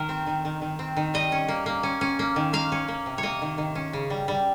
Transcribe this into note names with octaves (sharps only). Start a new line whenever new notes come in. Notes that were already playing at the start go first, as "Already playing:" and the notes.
Already playing: D#3 A#4
C4
D#3
D#3
D#3
C4
D#3
G3 D#5
C#4
A#3
A#3
C#4
C#4
A#3
D#3
A#3 F5
C#4
A#3
C3
C#5
A#3 D#5
D#3
D#3
C#4
C#3
G3
G3